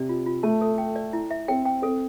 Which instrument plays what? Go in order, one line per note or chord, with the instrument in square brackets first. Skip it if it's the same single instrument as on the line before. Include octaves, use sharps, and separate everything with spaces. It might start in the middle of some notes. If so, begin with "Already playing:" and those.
Already playing: [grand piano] C3 [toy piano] D5
[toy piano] F4
F4
[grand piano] A3 [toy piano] A5
[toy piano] A4
G5
D5
E4
E5
[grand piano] C4 [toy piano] G5
[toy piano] G5
[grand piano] C4 [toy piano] A4